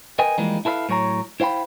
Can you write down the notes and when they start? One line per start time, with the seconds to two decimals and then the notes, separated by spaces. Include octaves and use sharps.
0.19 A#4 B4 D#5 G5 G#5
0.38 E3 F3 G3 G#3 A#3 D#4
0.65 E4 A4 B4 E5 F5
0.89 A2 F#3 C#5 G5 A#5
1.40 E4 C5 F5 G5 B5